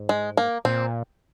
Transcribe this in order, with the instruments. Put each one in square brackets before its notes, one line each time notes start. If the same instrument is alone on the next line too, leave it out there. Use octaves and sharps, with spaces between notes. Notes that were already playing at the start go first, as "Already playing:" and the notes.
Already playing: [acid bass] G#2
[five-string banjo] G#3
A#3
[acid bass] A#2 [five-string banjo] C4